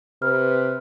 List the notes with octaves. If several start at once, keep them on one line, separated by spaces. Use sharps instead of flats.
C3 B4 F6